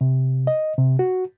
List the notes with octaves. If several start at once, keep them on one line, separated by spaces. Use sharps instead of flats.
C3
D#5
C3
F#4